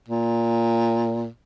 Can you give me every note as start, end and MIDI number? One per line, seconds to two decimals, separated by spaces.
0.08 1.27 46